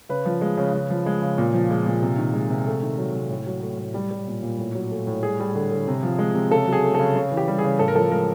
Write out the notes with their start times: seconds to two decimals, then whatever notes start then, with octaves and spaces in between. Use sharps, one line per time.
0.09 C#3 B4
0.26 F3
0.41 G#3
0.57 C#3
0.73 C#3
0.90 F3
1.06 G#3
1.22 C#3
1.38 A#2
1.54 F3
1.70 G#3
1.86 A#2
2.02 C3
2.18 D#3
2.34 G#3
2.50 C3
2.67 A3
2.83 D#3
2.98 F#3
3.14 C3
3.30 A2
3.46 F#3
3.62 A3
3.79 A2
3.94 G3
4.11 G3
4.27 A#2
4.43 A#2
4.58 A2
4.75 F#3
4.91 A3
5.07 A2
5.22 G3 G#4
5.40 G3
5.55 D3
5.72 D3
5.88 C3
6.03 F3
6.19 G#3
6.35 C3
6.51 C#3 A4
6.67 F#3
6.73 G#4
6.84 A3
6.95 C#3 A4
7.16 C#3
7.32 E3
7.37 G4
7.48 G3
7.59 G#4
7.64 C#3
7.79 A2 A4
7.88 A#4
7.95 F3 A4
8.12 G#3 A#4